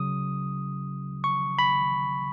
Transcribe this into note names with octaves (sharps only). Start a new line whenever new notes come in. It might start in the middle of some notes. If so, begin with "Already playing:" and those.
Already playing: C#3 F#3 D#6
C#6
B5